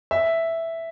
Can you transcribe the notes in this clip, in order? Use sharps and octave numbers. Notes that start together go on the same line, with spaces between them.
E5